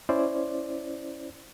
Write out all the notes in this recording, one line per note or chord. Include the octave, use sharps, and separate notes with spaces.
C#4 E4 C5 D5